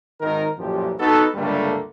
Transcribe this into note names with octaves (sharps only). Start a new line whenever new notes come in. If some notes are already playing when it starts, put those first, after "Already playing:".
G#1 D#3 D#4 A#4
A1 F#2 A#2 F3 G4
B3 D#4 F#4 A4
C#2 G2 D3 G3 A3 A#3